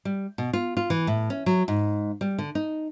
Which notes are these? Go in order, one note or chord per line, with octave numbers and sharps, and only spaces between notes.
G3
B2
F4
F4
E3
A2
C#4
F#3
G#2
G3
D3
D#4